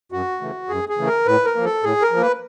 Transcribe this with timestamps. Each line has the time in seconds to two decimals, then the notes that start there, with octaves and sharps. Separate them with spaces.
0.12 F#2 F#4
0.41 C#3 E3 A3
0.69 F#2 G#4
0.89 G#4
0.98 C#3 E3 A3
1.07 A#4
1.26 A2 B4
1.45 A#4
1.56 F3 A#3
1.65 A4
1.83 A2 G#4
2.02 A#4
2.12 F3
2.17 A#3 B4